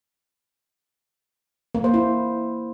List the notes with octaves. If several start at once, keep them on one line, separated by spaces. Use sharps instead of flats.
A#3
C5
E4